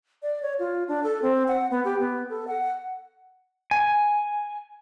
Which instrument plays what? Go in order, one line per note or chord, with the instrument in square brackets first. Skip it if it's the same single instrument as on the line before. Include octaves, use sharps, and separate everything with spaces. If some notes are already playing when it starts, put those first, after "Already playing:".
[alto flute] D5
C#5
F4
D4
A4
C4
F#5
B3
G4
B3
A4
F#5
[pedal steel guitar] G#5